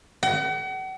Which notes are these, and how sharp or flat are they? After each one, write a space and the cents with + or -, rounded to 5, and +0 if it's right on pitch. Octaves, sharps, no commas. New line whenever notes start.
F#5 +40